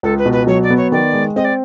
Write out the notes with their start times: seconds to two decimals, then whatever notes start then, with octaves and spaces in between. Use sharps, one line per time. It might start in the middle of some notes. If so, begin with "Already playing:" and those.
0.03 C#2 A4
0.18 B4
0.26 B2
0.32 B4
0.47 F#3 C#5
0.63 D5
0.70 B3
0.77 C#5
0.92 D#3 D5
1.13 G#3
1.36 C4 D#5
1.44 D5